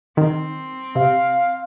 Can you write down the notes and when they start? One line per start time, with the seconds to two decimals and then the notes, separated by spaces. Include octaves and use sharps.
0.17 D#3 C4
0.95 C3 F5